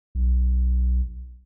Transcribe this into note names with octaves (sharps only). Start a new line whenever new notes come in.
B1